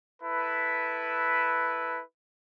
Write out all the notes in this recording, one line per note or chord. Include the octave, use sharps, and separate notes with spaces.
E4 A4 B4